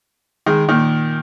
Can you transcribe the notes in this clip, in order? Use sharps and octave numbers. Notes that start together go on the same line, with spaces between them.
D#3 G#3
A#2 D#3